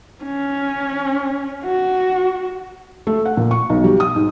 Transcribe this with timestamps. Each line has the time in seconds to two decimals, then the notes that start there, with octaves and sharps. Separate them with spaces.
0.24 C#4
1.64 F#4
3.07 A3
3.25 F#5
3.37 A#2
3.51 C#6
3.69 B1
3.84 G3
4.00 D#6
4.16 G#2